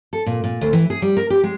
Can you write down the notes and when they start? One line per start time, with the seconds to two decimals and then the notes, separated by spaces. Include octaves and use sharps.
0.13 A4
0.26 A#2
0.44 A#2
0.61 D2
0.73 E3
0.90 G#4
1.02 G3
1.17 A#4
1.30 G4
1.43 G#3